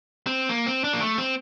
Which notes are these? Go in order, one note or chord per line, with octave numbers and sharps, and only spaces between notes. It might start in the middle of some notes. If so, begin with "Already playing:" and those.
C4
A#3
C4
D4
A#3
A3
C4